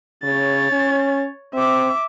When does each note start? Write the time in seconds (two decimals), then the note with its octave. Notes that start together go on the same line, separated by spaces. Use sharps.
0.24 C#3 C#5 A6
0.72 C#4
1.54 C4 E5 D6